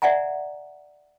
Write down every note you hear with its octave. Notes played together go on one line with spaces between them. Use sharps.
D5 E5 F#5 G#5 A#5